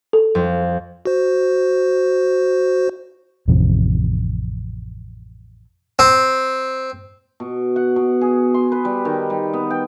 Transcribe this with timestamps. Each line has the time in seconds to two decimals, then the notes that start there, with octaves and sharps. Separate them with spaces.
0.13 A4
0.35 F2
1.05 F#4 C5
3.48 A1 F2 C3
5.99 C4
7.40 B2
7.76 F#5
7.96 B2
8.21 G#4
8.54 C6
8.72 B4
8.85 G3
9.05 D#3
9.30 G3
9.53 B3
9.71 G5